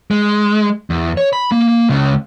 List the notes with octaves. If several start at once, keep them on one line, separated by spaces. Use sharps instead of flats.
G#3
E2
C#5
B5
A#3
C#2 C#3